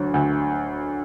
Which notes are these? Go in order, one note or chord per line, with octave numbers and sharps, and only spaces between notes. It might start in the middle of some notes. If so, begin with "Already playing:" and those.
Already playing: D2 D3 F#3
D2